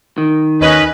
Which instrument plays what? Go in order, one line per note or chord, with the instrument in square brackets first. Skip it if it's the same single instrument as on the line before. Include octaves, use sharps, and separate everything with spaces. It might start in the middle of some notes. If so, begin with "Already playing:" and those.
[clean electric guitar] D#3
[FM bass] D#2 [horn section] C#4 B4 [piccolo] D#5